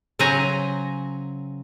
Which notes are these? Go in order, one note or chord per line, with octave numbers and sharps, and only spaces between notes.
C#3 F#3 C4 F#4 G#5 A#5